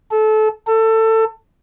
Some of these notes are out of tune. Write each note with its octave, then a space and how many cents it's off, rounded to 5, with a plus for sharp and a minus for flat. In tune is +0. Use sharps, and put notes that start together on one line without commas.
A4 -25
A4 +20